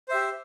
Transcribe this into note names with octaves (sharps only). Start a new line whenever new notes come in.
G4 C5 E5